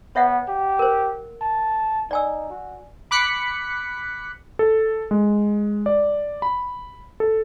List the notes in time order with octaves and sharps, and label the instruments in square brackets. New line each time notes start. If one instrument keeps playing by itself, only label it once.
[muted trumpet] B3 [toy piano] C#5 E5 F#5
[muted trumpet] G4
[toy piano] A#4 C5
[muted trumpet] A5
[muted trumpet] D#4 [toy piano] D5 G#5 E6
[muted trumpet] F#4
[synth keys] B5 D6 F#6 B6 C#7
[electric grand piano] A4
G#3
D5
B5
A4